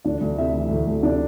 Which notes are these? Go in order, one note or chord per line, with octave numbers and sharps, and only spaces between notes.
D2 D4 D5
D2
C3 E4 E5
E3
D2
D2
C3 D4 D5